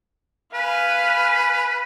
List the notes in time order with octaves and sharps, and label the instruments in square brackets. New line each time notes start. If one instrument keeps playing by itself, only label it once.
[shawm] B4 [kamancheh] F5 G#5